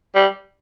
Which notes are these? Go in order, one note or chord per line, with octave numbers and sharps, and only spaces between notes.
G3